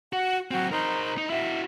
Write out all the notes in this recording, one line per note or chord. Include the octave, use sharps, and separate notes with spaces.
F#4 F#5
F#3 C4 F#4
D#4 A#4 C5
D#4
E4 F#4 E5